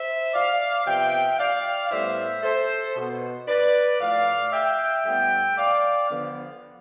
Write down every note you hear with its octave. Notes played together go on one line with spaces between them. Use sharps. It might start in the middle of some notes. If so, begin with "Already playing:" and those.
Already playing: C5 E5
D5 F5
C3 F3 B3 E5 G5
D5 F5
A2 G3 B3 C5 E5
A4 C5
B2 B3
B4 D5
A2 F3 A3 D5 F5
E5 G5
A2 G3 B3 E5 G5
D5 F5
D3 F3 B3